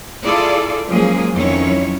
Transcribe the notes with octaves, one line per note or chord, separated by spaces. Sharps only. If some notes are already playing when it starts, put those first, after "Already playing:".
E4 F4 G#4 A4 D5
F3 F#3 G#3 A#3 C#4 G#4
F2 D#3 F#3 C#4 E4 C#5